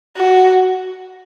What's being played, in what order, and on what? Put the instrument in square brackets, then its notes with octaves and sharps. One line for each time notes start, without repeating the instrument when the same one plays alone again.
[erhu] F#4